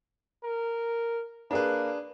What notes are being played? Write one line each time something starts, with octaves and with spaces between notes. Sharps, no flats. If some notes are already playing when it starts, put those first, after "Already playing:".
A#4
A#3 D4 G#4 B4